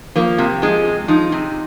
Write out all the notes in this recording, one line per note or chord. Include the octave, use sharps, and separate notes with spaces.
F3 A#3
C3
F3 G#3
C3
F3 D#4
C3